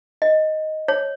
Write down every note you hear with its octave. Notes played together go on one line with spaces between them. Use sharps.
D#5
C#5